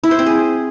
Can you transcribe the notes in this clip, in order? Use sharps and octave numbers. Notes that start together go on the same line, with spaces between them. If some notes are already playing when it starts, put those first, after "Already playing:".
E4
C5
C4
G#4